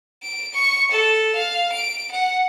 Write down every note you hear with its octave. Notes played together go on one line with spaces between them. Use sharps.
D7
C#6
A4
F5
D7
F#5